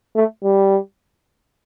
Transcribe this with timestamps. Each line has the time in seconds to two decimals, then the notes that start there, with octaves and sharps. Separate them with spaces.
0.15 A3
0.44 G3